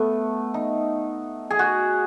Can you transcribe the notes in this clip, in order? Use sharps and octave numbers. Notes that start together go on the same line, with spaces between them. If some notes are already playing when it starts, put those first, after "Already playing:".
Already playing: A3 B3
D#4
G#4
F#4